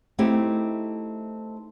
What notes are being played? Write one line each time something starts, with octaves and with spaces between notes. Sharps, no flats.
A3 C4 D#4 E4 G4